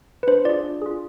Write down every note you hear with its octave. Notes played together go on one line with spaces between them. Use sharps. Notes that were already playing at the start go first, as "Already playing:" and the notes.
B4
D4 C5
F4 G#4 D5
D4
F4 G#4